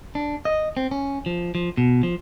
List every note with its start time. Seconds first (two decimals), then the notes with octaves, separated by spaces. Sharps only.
0.15 D4
0.45 D#5
0.77 C4
0.91 C#4
1.26 F3
1.55 F3
1.78 B2
2.03 F3